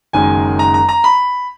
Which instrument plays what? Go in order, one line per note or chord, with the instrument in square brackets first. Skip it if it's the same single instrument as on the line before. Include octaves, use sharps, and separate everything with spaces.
[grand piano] F#1 F#2 D#3 G#3 G#5
A#5
A#5
A#5
B5